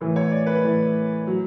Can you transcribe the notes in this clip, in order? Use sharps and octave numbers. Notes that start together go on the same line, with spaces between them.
A2 E3
C#5
D5
B4
A2 E3
F#3